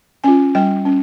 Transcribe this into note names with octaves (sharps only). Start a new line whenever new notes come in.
C#4 F4 G#5
G3 G5
C#4